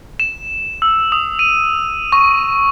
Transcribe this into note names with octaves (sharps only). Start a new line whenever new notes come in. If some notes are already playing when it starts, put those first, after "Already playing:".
E7
E6
D#6
D#7
C#6